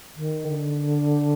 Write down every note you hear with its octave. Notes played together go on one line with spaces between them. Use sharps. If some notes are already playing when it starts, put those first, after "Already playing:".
D#3
D3